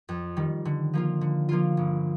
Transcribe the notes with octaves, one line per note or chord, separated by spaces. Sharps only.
F2
D#3 G3
D3
F3 A#3 F4
D3
F3 A#3 F4
G1